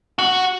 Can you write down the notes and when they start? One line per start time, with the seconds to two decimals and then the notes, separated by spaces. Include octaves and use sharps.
0.19 F#4